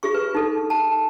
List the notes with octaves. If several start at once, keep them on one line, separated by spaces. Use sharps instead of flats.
F4 G4 G#4 C#6
B4
D#4 A4
A5